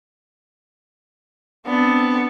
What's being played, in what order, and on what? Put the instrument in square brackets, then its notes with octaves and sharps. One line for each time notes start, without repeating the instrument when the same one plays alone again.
[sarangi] B3 [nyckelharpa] C4 D4